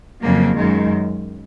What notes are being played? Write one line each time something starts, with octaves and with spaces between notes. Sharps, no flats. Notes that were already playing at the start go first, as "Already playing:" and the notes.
F2 C#3 F#3 A#3
F#2 D#3 G#3